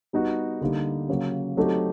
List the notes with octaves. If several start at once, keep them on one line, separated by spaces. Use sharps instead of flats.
G3 B3 D#4 F#4
D3 G3 A#3 D#4
C#3 F#3 A#3
F#3 A3 C4 D#4 G4